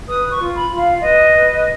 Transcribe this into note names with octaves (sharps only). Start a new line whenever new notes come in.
B4 D#6
C#6
F4
B5
F4
F5
B4 D#5
B4